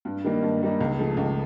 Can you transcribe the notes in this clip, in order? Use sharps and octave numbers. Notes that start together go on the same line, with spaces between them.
G2
D#3 G3 A#3 D#4
G2
D#3 G3 A#3 D#4
C#2
C#3 F3 A3
C#2